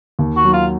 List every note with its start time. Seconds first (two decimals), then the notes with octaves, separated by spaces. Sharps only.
0.19 D#2
0.36 F#4
0.45 F#3
0.54 F4